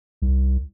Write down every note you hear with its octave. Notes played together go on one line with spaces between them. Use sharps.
C2